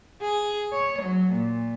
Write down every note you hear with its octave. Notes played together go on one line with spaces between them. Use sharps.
G#4
C#5
F#3
A#2